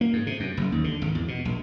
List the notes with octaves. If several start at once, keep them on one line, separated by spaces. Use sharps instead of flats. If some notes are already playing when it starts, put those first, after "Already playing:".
A#3
G#2
C3
F#2
F#1
D#2
D3
G#1
E2
B2
A#1